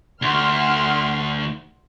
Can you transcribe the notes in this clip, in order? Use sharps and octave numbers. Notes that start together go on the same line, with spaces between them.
D2 F#5 C6 F6